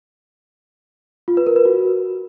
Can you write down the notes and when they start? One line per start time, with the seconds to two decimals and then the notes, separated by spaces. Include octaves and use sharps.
1.28 F4
1.37 B4
1.47 A#4
1.56 B4
1.65 F#4